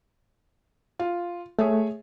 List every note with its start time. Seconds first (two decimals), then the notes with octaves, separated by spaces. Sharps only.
0.99 F4
1.59 A3 G#4 C#5 E5